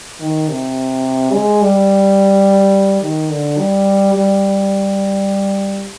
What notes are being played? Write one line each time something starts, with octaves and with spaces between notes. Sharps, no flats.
D#3
C3
G#3
G3
D#3
D3
G3
G3